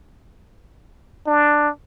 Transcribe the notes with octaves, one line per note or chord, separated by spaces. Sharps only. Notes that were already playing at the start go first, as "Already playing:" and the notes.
D4